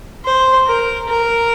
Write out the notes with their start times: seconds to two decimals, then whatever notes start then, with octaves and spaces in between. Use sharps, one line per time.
0.25 C5
0.67 A#4
1.08 A#4